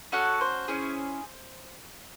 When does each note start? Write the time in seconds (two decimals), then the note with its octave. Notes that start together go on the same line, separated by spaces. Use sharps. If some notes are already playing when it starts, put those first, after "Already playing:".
0.12 C#4 F#4 A4 F#5
0.41 C5
0.68 C#4 E4 G#4